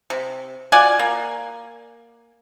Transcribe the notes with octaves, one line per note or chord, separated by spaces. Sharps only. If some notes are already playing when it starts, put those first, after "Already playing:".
C3
F4 F#4 D5 G#5
A#3